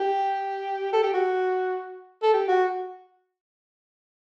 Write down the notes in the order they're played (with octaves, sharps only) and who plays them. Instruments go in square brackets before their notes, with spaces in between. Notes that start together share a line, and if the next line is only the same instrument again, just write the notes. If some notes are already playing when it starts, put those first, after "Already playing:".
Already playing: [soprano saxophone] G4
A4
G4
F#4
A4
G4
F#4